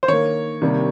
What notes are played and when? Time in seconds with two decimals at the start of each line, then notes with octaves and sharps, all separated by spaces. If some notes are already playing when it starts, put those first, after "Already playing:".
0.03 C5
0.08 D#3 A#3 C#5
0.62 C3 D#3 G3 A#3